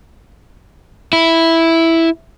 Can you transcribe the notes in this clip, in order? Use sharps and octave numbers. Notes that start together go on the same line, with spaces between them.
E4